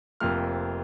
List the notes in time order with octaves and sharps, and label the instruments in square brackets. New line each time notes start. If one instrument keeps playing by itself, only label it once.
[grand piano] F1 F2 F3 A#3 F6